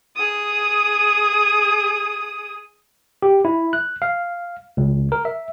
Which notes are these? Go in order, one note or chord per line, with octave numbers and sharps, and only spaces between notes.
G#4 D#6
G4
E4
F#6
F5
C#2
A#4
E5